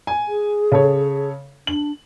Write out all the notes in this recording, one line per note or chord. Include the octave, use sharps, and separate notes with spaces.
G#5
G#4
C#3 A4 C#5
D4 F#7